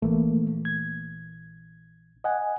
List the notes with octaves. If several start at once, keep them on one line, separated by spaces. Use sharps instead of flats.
A#1 E3 A3 A#3
G#6
D#5 F#5 G#5